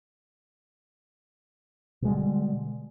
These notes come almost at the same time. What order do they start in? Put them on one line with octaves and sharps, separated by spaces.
B2 G#3 G3 D3